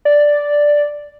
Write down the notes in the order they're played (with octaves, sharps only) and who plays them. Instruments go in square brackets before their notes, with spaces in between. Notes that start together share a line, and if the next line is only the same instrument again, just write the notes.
[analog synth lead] D5